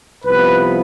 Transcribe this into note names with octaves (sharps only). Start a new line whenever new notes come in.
C2 C3 F3 B3 B4